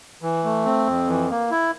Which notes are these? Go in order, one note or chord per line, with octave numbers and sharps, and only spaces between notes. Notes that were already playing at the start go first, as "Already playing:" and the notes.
E3
A3
C4
F2
E3
A#3
E4